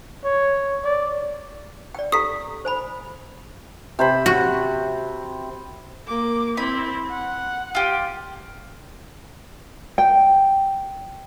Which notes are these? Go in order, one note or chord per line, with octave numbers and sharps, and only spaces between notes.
C#5
D5
D5 G5
G4 A4 A#5 D#6 B6
C5 G#5 B5
C3 C5 B5
F#4
A#3 D6
C4 E4 B5
F#5
F4 G4
G5